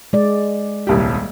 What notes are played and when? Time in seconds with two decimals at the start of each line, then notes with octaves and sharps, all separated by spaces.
0.13 G#3 D5
0.87 D#1 C2 G4